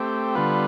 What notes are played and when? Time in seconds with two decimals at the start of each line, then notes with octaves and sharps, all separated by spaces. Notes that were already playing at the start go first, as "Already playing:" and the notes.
Already playing: A3 C4 G4
0.35 D3 G3 B3 F4 B4